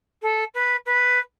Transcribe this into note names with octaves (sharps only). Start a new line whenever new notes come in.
A4
B4
B4